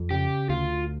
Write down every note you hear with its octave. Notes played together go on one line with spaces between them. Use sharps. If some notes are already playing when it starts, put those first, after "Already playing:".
Already playing: F2
C#3 G4
D2 F4